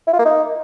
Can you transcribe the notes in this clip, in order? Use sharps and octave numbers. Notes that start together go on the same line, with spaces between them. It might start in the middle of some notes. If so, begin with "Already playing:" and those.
E4
F4
A#3
D#4